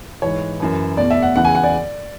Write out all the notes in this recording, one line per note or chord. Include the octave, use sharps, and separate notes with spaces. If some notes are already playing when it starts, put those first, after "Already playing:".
G#2 E3 C#5
F#2 E3
E2 B2 D5
E5
F#5
E2 C#3 E3 F#5
G#5
F#5
D5